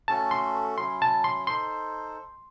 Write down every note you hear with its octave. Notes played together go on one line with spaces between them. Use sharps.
A3 C#4 F#4 A4 A5
C6
F#3 C#4 E4 C6
A5
C6
D#4 A4 C5 C6